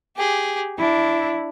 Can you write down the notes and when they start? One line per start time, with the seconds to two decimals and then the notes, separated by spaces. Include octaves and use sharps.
0.16 G4 G#4
0.78 D4 E4